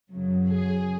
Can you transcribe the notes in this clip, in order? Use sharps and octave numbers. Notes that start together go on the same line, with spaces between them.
F#2 C#3 F#3
G#4